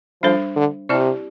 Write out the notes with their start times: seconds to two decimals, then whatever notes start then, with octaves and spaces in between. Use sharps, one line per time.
0.23 F3 G3 D4 A4 C5
0.56 D3
0.89 C3 C4 E4 G4 D5